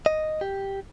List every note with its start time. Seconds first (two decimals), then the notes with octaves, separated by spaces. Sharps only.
0.06 D#5
0.41 G4